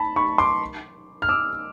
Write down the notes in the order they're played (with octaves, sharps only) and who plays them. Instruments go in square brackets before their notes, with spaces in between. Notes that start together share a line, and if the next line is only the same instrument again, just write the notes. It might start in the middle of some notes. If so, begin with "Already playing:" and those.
Already playing: [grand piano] A5 B5
B5 C#6
C6 D6
F6
D6 E6